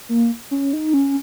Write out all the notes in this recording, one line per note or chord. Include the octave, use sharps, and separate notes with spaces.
A#3
C#4
D#4
C#4